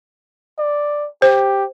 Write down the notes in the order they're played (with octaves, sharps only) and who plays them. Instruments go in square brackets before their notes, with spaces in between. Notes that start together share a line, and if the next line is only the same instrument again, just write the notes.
[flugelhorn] D5
[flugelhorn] G4 [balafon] C5